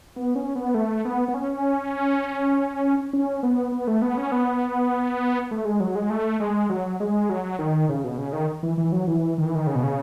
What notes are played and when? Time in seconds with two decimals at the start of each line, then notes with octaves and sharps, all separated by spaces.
0.16 B3
0.35 C#4
0.55 B3
0.75 A3
1.05 B3
1.28 B3
1.34 C#4
3.13 C#4
3.43 B3
3.72 B3
3.87 A3
4.02 B3
4.17 C#4
4.32 B3
5.51 A3
5.65 G#3
5.80 F#3
5.95 G#3
6.10 A3
6.40 G#3
6.70 F#3
7.00 G#3
7.29 F#3
7.59 D#3
7.89 C#3
8.04 B2
8.18 C#3
8.33 D#3
8.63 E3
8.78 E3
8.92 F#3
9.07 E3
9.38 D#3
9.46 E3
9.55 D#3
9.67 C#3
9.75 B2
9.84 C#3